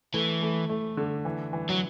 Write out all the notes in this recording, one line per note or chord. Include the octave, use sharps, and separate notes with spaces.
E3 A3
A3
A3
D3
E3
E3
F#3